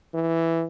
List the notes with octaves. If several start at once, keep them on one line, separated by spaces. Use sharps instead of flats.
E3